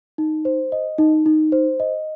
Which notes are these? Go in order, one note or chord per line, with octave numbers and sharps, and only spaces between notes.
D#4
C5
D#5
D#4
D#4
C5
D#5